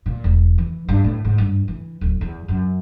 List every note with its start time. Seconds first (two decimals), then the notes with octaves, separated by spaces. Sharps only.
0.06 A#2
0.24 E1
0.58 E3
0.88 G2
1.04 A2
1.25 G#2
1.38 G2
1.68 E3
2.01 D1
2.21 E2
2.48 F#2